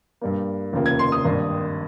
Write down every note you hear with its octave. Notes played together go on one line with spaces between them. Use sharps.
G2 G3 A#3
F1 D#2 C#3 F3 A#3
G#6
C6
D#6
G#1 G2 D#3 A#3